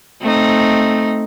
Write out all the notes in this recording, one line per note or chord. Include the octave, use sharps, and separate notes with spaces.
A3 C4 D#4